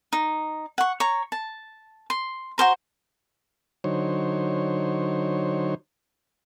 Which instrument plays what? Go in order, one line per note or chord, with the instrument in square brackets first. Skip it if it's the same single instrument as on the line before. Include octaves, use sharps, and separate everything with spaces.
[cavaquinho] D#4
F#5 C#6
C#5 A#5
A5
C6
F#4 G#4 C5 A#5
[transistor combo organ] D3 F#3 D#4 C5 C#5